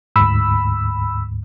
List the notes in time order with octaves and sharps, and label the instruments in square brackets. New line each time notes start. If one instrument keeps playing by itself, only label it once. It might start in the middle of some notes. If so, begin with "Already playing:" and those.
[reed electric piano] D2 G#2 [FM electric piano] B5 E6